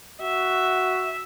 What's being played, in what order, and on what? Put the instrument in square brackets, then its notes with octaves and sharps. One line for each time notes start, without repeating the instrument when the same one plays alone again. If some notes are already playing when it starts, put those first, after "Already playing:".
[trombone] F#4 [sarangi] E5